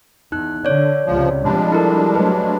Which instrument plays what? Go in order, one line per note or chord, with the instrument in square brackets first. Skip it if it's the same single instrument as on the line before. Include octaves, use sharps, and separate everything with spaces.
[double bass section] E2 [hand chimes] D#4 F#6
[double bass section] D3 [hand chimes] C#5 D5
[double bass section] C#2 C3 [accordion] F3
[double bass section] C3 F3 [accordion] G3 G#3 D4
[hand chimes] E4 A4 A#4
[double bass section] F#3 A3 [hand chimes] B4